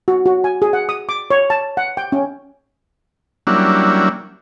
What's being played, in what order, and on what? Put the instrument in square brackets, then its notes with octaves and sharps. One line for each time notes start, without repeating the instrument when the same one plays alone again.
[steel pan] F#4
F#4
G#5
G#4
F#5
D#6
D6
C#5
A5
F#5
G5
C#4
[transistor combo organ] F#3 G3 A#3 C#4 D4 E4